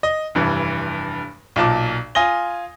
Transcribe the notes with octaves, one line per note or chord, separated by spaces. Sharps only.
D#5
F1 G2 E3
B1 A#2 A5 D6
F4 G#5 D#6 A#6 G7